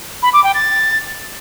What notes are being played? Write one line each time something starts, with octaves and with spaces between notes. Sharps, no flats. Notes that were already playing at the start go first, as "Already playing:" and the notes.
B5
D6
G5
A6